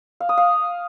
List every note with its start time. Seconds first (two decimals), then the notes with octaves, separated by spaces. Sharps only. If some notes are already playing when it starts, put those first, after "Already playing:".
0.20 F5
0.29 D#6
0.37 F5